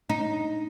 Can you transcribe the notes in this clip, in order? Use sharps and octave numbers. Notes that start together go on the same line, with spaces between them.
D#4